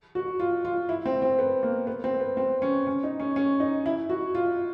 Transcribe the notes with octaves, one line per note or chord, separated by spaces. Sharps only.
F#4
F4
F4
E4
C4
C4
B3
A#3
B3
C4
B3
C4
C#4
C#4
D#4
C#4
C#4
D#4
E4
F#4
F4